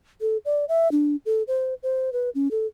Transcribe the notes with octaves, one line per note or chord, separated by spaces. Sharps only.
A4
D5
E5
D4
A4
C5
C5
B4
C#4
A4